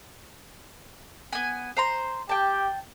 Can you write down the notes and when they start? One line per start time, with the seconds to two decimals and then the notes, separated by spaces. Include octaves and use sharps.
1.33 B3 G#5
1.77 C5 A#5 C6
2.29 G4 G5 A5